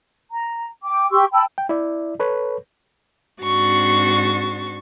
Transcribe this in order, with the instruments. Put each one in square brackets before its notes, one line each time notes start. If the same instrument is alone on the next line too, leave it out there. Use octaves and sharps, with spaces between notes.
[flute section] A#5
G5 D6
G4 C6 C#6 E6
G5 A5 B5 E6
[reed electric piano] G5
E4 D5 E5
A4 B4 C#5
[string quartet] G#2 C4 D4 F#4 C#6 A6